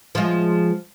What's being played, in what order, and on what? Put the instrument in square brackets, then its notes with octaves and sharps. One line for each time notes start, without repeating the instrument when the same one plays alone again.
[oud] F3 G#3